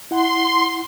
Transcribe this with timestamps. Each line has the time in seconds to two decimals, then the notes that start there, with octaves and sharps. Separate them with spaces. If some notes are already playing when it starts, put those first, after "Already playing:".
0.11 E4 F#5 C6